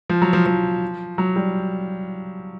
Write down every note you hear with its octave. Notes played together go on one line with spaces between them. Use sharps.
F3
F#3
F3
F3
F#3
G3